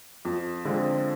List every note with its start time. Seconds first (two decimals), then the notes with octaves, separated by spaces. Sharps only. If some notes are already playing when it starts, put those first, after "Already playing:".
0.25 F2
0.65 D3 F3 G#3 C4